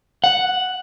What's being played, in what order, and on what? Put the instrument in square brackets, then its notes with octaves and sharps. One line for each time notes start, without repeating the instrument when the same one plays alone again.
[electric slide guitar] F#5